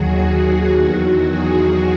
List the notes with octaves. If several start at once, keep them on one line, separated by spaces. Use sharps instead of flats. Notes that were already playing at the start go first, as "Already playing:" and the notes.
Already playing: D#2 D#3 F#3 F#4 G#4
E2 D#3 F#3
G#4